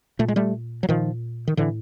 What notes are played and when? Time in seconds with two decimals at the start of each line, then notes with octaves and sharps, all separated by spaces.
0.19 A#2 A3
0.28 G#3
0.36 G3 A3
0.83 F#3
0.89 A#2 D#3 F3
1.47 D#3
1.57 A2 D3 E3